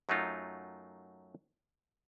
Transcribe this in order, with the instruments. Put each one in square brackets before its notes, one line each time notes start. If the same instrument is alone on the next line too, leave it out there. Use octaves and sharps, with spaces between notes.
[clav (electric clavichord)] F#2 F#3 A3 D#4 F4